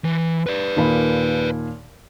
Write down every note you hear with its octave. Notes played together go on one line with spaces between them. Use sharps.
E3
B4 D5
D#2 A#2 B5